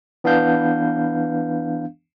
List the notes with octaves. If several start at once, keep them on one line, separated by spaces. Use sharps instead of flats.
E3 B3 D4 F5 G6